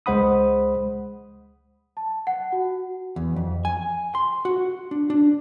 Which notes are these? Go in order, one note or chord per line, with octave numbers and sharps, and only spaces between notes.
C#2 G#3 C5 F#5 B5 D#6
A5
F#5
F#4
E2
F2
G#5
C6
F#4
D4
D4